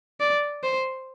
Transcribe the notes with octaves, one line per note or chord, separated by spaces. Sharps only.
D5
C5